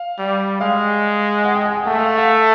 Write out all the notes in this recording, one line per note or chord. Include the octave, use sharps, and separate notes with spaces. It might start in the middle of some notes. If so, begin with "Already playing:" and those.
Already playing: F5
G3
G#3 F5
F#5
G5
G#5
G5
A3 F#5
F5
F5